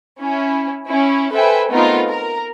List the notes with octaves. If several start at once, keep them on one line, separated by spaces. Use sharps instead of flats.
C#4 E4
C#4 E4
A4 B4 C5 E5 G5 G#5
A3 B3 C4 D#4 F4 A#4
A#4 A#5